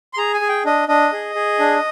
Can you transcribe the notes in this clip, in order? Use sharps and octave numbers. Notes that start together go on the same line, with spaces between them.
C6
G#4 A#5
G#5
G#4
G5
D4 D#5
D4 D#5
G#4
G#4
D4